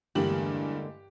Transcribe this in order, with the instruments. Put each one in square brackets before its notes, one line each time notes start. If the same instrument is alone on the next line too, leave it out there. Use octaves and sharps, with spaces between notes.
[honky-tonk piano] E2 G2 F#7 [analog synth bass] D3 [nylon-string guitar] G#3 A#3 [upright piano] G4